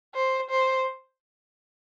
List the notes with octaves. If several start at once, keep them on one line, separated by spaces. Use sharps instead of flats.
C5
C5